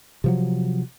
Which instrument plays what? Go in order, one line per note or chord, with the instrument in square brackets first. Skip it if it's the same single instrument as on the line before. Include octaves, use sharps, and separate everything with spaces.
[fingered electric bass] C3 F3 F#3